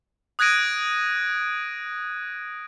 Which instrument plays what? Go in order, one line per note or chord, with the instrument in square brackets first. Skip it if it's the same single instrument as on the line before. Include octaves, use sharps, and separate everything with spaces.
[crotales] D#6 F#6 G#6 A#6 D7 D#7